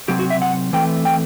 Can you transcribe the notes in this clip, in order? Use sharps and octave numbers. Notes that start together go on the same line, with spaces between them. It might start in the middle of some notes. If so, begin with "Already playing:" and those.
C3 F#3 C4 G4
F#4
E5
F#5
E3 A3 C4 G5
G5